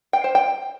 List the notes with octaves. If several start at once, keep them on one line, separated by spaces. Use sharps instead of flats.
G5
C5
G5